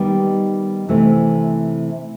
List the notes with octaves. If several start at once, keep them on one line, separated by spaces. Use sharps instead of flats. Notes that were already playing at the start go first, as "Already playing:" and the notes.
Already playing: D#3 G3 B3 D#4
C3 E3 A3